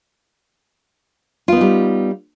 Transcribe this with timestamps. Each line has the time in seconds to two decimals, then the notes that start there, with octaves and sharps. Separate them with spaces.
1.48 F4
1.52 B3
1.57 D#4
1.61 G3